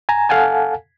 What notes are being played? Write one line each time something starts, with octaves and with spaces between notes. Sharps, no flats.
G#5 A#5
A4 F5 F#5 G#5 A5